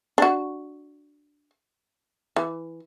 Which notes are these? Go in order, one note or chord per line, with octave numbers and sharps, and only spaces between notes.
D4 F#4
E3